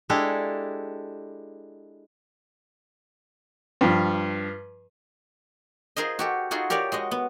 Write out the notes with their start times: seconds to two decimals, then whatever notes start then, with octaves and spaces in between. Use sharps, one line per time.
0.10 G#3 D4 E4 G4 A4
3.81 G2 F3
5.96 F4 G#4 A#4 C5 D#5
6.19 F#4 G4 A4
6.51 D#4 F4 F#4 G#4 A4
6.70 G4 A#4 C#5 D5 F5
6.92 G#3 F#4 D#5
7.11 B3